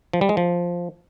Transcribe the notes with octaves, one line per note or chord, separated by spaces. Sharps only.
F3
G3
G#3
F3